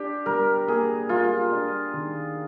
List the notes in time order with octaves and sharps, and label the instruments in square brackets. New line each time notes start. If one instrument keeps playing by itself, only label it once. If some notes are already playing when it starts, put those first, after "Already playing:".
Already playing: [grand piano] D4 [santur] G4
[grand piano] G3 [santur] A#4
[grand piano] A#3 [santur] G#4
[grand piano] G3 [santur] F4
[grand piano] D4
D#3